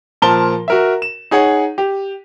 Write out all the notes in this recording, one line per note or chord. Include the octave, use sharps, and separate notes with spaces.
A#2 F3 A#4 A5 G7
F#4 A#4 E5
E7
D#4 G#4 C#5 F#5
G4